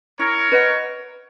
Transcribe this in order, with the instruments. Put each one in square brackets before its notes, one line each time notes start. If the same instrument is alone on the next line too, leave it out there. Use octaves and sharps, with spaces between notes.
[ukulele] E4 [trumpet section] A#4 C#5
[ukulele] B4 D#5 F#5